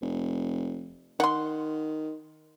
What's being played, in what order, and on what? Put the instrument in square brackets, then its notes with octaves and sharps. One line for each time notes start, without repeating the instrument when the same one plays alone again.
[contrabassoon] F1
[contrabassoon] D#3 [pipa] F#5 C6